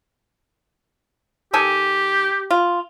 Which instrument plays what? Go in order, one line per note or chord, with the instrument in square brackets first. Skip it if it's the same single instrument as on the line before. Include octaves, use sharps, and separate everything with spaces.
[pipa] D#3 A4 G#5 [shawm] G4
[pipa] F4